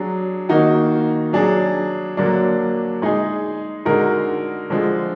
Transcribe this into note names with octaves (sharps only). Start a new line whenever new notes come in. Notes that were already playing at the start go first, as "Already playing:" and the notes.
Already playing: F#3 D4 G#4
D#3 A#3 D#4 F#4
F#3 D4 G#4
D3 F#3 A#3 D4
G#3 D#4 G#4
D3 G#3 D#4 F#4 A#4
D3 F3 G#3